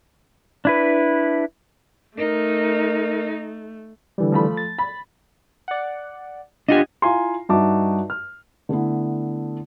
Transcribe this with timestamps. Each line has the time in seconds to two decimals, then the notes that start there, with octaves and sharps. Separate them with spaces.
0.65 D4 E4 B4
2.18 A3 D#4 A#4
4.18 D3 E3 G3
4.32 F3 A3 B5
4.57 A6
4.79 B5
5.68 D5 F#5
6.68 D4 F4 G4 D#5 F#5 G#5
7.02 E4 F4 F5 G#5 A#5 C6
7.49 G2 D#4 F#4 E5 A5 D6
8.10 F6
8.69 D3 A3 B3 E4